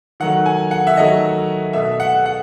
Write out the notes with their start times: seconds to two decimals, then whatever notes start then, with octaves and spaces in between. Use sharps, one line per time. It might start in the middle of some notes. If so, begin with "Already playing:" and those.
0.20 D#3 F#3 A3 F#5
0.46 G#5
0.71 F#5
0.87 E5
0.97 D#3 F#3 A3 D#5
1.73 B2 A3 E5
2.00 F#5
2.26 F#5